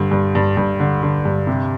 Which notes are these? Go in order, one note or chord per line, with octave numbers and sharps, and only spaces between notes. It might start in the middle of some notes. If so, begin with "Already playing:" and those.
Already playing: G2 D3
G2
G2
G2
D3
D3
G2
C3